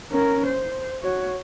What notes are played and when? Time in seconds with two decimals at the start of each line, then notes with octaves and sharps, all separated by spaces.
0.11 C#4 A#4
0.46 C5
1.02 F#4 C#5